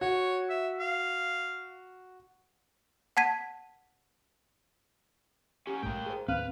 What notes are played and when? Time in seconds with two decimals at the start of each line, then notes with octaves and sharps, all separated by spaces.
0.01 F#4 C#5
0.49 E5
0.80 F5
3.17 F#5 A5 G#6 B6 D#7
5.67 C#4 F#4 G4
5.83 A#1 G#2 A3 A#3 G5
6.06 G#4 C5
6.28 D#2 A2 C4 B4 F5